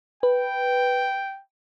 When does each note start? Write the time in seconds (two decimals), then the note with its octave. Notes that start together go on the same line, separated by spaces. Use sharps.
0.23 B4 G5